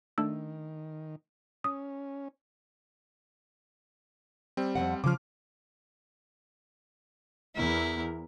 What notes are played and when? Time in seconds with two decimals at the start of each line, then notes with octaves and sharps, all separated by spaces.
0.18 D#3 A3 D4 E6
1.64 C#4 D#6
4.57 G3 C4
4.75 F2 F3 F#5
5.04 C#3 F3 D6 F6
7.56 E2 E4 A#4